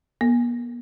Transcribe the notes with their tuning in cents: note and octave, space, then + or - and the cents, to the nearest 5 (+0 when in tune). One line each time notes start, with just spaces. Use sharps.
B3 -45